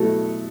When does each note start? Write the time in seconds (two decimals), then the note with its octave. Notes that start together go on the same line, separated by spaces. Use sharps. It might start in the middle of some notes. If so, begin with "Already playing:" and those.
Already playing: B2 F#3 A3 E4 A4